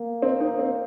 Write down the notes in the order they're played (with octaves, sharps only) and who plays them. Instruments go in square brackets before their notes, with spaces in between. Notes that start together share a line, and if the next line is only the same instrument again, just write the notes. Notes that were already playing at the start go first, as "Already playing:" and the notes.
Already playing: [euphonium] A#3
[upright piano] C4
D#4
C4